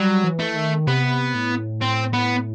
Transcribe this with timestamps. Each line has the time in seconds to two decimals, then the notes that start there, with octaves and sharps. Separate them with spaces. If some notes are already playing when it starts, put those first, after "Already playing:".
Already playing: F#3 G3
0.24 E3
0.39 A3
0.56 D#3
0.87 C3 B3
1.34 A2
1.81 C4
2.13 B3